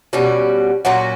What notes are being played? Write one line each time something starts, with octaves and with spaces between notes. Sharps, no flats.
B2 G3 C#4 F#4
A#2 F#3 C#4 F#4